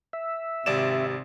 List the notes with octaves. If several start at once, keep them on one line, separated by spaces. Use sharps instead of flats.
E5
G#1 C3 G4 D5 E7